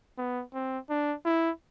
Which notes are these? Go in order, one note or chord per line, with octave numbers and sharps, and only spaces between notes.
B3
C4
D4
E4